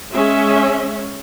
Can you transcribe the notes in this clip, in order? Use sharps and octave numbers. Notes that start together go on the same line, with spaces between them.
G#3 C#4 E5